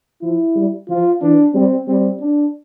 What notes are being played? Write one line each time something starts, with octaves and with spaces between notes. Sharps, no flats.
F3 E4
G3
F3 F4
E3 D4
G3 C4
G3 C4
D4